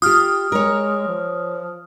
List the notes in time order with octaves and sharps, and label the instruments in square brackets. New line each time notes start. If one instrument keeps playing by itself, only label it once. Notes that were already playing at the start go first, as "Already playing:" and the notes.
[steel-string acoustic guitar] F4 G4 [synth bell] D#6 F6
[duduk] G#3 [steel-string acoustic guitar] A#4 C#5
[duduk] F3